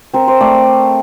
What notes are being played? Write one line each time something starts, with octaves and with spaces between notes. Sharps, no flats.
C4 A#4
C5
A3 D5